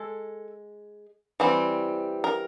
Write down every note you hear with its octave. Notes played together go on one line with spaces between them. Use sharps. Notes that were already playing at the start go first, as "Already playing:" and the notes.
Already playing: G#3 A4
E3 G3 C4
A#4